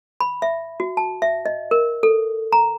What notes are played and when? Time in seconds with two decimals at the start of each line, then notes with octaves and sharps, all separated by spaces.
0.20 B5
0.42 E5
0.80 F#4
0.97 A5
1.22 E5
1.46 D#5
1.71 A#4
2.03 A4
2.53 A#5